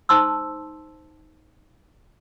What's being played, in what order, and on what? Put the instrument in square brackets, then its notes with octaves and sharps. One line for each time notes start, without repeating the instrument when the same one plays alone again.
[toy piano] D#4 C5 A5 C6 E6